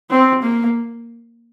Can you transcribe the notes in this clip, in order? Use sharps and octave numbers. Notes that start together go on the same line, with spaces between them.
C4
A#3